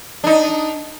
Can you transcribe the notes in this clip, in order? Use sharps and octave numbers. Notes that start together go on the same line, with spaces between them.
D4 D#4